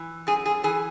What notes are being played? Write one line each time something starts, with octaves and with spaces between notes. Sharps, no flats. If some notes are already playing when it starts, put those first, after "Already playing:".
Already playing: E3
F#2 G#4
G#4
E3 G#4